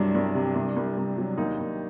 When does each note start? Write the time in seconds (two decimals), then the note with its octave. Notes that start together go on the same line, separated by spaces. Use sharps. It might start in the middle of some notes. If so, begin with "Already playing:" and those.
Already playing: C2 G2 F#3 D4
0.15 C2
0.35 C3
0.55 C2
0.77 C2
0.97 C2
1.18 F#3
1.38 D#2 D#4
1.59 D#2